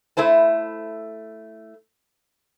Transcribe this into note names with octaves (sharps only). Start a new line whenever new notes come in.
A3 E4 C5 A5